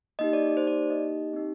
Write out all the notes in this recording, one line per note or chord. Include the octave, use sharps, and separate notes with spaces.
A#3 D#4 G4 D#5
D5
D5
C5
D5
D#5
C4 D#4 G4